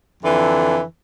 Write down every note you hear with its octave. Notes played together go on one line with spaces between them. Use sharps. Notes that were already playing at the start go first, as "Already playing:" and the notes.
F2 D3 E3